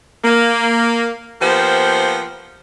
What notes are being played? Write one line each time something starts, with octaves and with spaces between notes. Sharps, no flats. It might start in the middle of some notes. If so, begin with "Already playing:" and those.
A#3
F3 A#3 B3 G4 C5